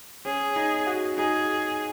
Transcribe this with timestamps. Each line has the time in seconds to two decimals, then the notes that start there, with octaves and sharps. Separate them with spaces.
0.25 C#4 G#4
0.56 D#4
0.87 F#4
1.17 D#4 G#4